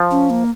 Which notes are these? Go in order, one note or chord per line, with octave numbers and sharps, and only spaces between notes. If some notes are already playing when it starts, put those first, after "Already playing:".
Already playing: F3
C#4
A#3